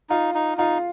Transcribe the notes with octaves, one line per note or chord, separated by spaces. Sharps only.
D#4 F4
D#4
D#4 F4